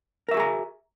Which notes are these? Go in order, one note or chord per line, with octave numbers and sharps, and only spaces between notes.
F#4 G#4 A#4 E5 A#5